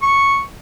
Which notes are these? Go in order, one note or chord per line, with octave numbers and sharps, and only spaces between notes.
C#6